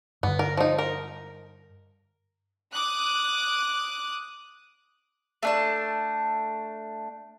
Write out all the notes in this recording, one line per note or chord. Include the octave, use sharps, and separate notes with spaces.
G2 D3 B3
A#4
F3 D#4
A#4
D6 D#6 F#6
A3 D4 A5